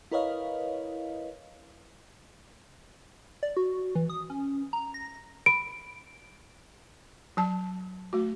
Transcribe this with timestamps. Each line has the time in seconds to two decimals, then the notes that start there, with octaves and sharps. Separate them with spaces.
0.12 E4 A#4 B4 C#5 D#5 F5
3.43 D5
3.57 F#4
3.95 E3
4.10 D#6
4.30 C#4
4.73 A#5
4.94 A#6
5.46 B5 D7
7.37 F#3 A5
8.13 A3 F#4